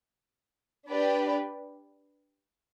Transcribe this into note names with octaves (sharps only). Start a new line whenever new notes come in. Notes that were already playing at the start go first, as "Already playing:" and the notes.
D4 G4 B4 D5